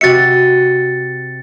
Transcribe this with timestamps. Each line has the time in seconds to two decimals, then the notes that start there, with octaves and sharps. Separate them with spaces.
0.01 C3 F#4 E5 A6 C#7